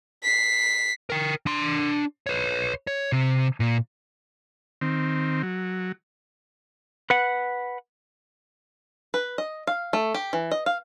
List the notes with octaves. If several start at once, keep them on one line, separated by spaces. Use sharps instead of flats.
B6 C7
A#4 G5
D4 C6
B4 C#5
C#5
C3
A#2
D#3 C4
F#3
B4 F#5
B4
D#5
F5
A3
G4
E3
D#5
F5